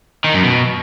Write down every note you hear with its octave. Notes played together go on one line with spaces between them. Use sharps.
D#3
F#2
B2